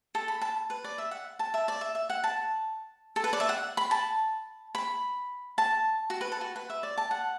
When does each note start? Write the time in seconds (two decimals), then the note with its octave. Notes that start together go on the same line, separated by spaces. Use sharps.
0.15 A4
0.28 B5
0.41 A5
0.70 B4
0.84 D5
0.98 E5
1.11 F#5
1.39 A5
1.54 E5
1.68 D5
1.81 E5
1.95 E5
2.10 F#5
2.24 A5
3.16 A4
3.24 B4
3.33 D5
3.40 E5
3.49 F#5
3.77 B5
3.91 A5
4.75 B5
5.58 A5
6.10 F#4
6.21 B4
6.32 A4
6.41 F#4
6.56 B4
6.70 E5
6.83 D5
6.97 A5
7.11 F#5